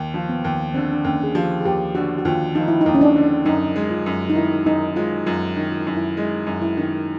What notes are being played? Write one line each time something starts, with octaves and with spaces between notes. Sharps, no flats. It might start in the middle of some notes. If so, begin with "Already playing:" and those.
Already playing: D#2
F3
B3
D#2
D3 C4
D4
D#2 C#4
G#4
F3 G4
G#4
D#2 G4
D3 F#4
F#4
D#2 F4
F3 D#4
E4
D#2 D#4
C#4
D4
D3
F#2 D#4
G#3
F4
F#2
D#4
D#3 E4
F#2 D#4
G#3 F4
F#2 F4
D#3
F4
E4
F#2 D#4
E4
G#3 E4
F#2
E4
D#3